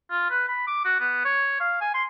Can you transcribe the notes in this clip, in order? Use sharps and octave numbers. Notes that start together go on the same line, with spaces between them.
F4
B4
B5
D6
F#4
B3
C#5
F5
G#5
C6